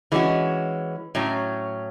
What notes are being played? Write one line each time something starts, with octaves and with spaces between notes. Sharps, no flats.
E3 G#3 C#4 F#4
A2 F#3 C#4